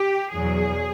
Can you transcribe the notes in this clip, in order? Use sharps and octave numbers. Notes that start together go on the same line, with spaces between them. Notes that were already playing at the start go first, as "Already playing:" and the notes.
Already playing: G4
E2 B2 F#3 G#4